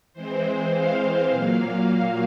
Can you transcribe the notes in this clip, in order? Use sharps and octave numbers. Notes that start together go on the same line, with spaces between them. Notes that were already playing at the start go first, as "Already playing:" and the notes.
E3 G#3 C4 C5
F5
F5
A#2 F#3 A#3 F5